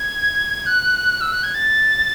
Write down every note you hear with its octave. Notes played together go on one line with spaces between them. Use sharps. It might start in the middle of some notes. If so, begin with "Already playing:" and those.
Already playing: G#6
F#6
E6
F#6
G#6
A6